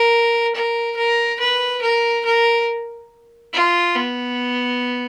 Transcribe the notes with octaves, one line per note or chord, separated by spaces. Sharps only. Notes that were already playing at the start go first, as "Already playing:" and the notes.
Already playing: A#4
A#4
A#4
B4
A#4
A#4
F4
B3